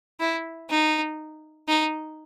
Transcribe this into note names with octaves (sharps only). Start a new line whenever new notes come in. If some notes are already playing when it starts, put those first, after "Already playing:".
E4
D#4
D#4